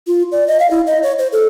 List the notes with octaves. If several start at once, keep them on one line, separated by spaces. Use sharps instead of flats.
F4
D5
D#5
F5
E4
D#5
C#5
C5
A4